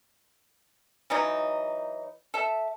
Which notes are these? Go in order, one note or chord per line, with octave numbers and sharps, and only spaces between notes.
E3 F#3 D#4
A4 E5